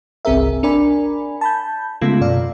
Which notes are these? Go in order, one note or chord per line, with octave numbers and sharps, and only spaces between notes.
G1 C2 C4 G#4 A#4 E5
D4 A#4 D5 G#5 B5
A5 B5 G6
C#3 G#3 A3 B3 F4
F#2 B2 D5 F5